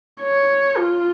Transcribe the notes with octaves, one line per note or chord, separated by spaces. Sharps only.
C#5
F4